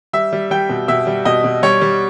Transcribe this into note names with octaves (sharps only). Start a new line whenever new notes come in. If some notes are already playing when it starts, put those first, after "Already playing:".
G3 E5
G3
G3 G5
B2
B2 E5
G3
B2 D#5
B2
G3 C#5
G3